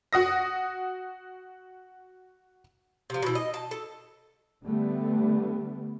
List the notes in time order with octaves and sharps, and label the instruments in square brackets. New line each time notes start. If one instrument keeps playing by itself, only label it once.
[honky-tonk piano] F#4 F#5 D#6 A#6
[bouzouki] C3 F3
B2 E3
D#5
A5
A4
[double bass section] D3 G3 A3 B3